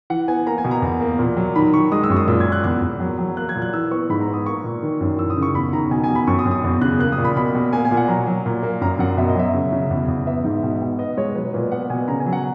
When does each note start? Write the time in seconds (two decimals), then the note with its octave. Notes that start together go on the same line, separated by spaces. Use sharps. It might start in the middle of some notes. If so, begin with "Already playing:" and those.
0.10 E3 F#5
0.28 B3 G#5
0.47 A#3 A#5
0.58 G#5
0.64 B2
0.71 A#5
0.82 E2
1.01 A#3
1.19 A#2
1.37 F#3
1.55 D#3 B5
1.74 D#3 C#6
1.92 G#3 D#6
2.04 E6
2.10 F#2 C#6
2.16 D#6
2.27 A#2 E6
2.40 G#6
2.45 A#3
2.52 F#6
2.64 E2 F#6
2.82 E2
3.00 F#3
3.19 F#3
3.37 A#3 F#6
3.49 G#6
3.55 A#2
3.62 F#6
3.73 E3 E6
3.91 B3 C#6
4.10 G#2 B5
4.21 A#5
4.28 B3
4.33 D#6
4.46 A#3 C#6
4.64 A#2
4.83 D#3
5.01 F#2
5.18 E3 E6
5.30 D#6
5.37 C#3
5.42 C#6
5.55 E2 B5
5.73 D#3 A#5
5.91 B2 G#5
6.04 G#5
6.09 B2
6.15 B5
6.27 F#2 C#6
6.39 D#6
6.45 F#2
6.51 D#6
6.64 E2
6.81 C#3 F#6
6.99 A#3 F#6
7.12 D#6
7.18 A#2
7.24 B5
7.36 B2 B5
7.55 B2
7.73 A#3 G#5
7.85 G#5
7.91 A#2
7.97 F#5
8.08 F#3 A#5
8.27 F#3
8.46 A#2
8.63 A#3
8.81 F#2 A#5
8.99 F#2 F#5
9.17 B2 E5
9.29 D#5
9.35 F#3 E5
9.54 C#3
9.72 C#3
9.91 E2
10.08 E2
10.26 B3 E5
10.44 G#2
10.63 B2
10.82 B2
10.99 B3 D#5
11.17 G#3 C#5
11.35 F#3 B4
11.53 A#2 B4
11.72 B3 F#5
11.90 B2 G#5
12.08 C#3 A#5
12.20 G#5
12.26 F#3
12.33 F#5